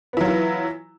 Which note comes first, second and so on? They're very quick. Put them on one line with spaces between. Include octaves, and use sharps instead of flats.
B3 E4 F#3 F4 E3